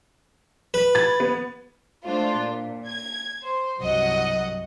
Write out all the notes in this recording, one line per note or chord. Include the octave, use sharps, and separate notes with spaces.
B4
B5 G#6 A6
B3
A3 D4 F4 C5
A#2
G#6
C5
C2 G2 F#3 D#5 F#5